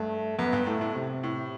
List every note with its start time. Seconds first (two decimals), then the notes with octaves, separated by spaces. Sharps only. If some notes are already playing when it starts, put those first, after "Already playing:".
Already playing: G2 A3
0.39 F#2 B3
0.53 G2
0.67 A2 A3
0.81 A2
0.95 C3
1.23 A2